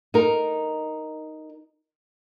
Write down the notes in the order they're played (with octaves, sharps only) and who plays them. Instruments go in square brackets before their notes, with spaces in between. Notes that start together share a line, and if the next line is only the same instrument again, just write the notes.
[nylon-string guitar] D#4 A#4